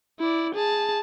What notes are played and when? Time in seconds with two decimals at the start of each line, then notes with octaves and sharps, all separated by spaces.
0.20 E4 D5
0.55 G#4 A5